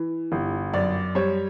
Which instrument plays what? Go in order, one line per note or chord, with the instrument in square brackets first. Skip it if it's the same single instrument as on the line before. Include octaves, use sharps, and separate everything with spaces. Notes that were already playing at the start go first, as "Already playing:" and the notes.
Already playing: [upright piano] E3
G1
F#2 D5
G3 C#5